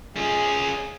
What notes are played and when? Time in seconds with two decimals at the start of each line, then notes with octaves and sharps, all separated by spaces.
0.16 C#4 F4 G#4